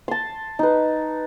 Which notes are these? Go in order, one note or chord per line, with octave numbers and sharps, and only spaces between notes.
A5 C6
D#4 B4